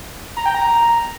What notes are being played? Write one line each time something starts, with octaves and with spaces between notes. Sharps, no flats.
A#5
G5
A#5